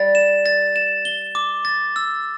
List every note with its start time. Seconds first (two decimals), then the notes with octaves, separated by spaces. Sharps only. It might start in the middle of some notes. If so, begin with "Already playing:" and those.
Already playing: G3 A6
0.15 E7
0.46 A6
0.76 E7
1.05 G7
1.35 D6
1.65 A6
1.96 E6